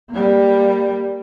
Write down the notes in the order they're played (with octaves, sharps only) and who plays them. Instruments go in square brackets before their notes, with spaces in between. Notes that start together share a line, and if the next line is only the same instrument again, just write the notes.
[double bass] G3 A#3